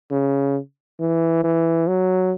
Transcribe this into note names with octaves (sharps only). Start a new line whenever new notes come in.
C#3
E3
E3
F#3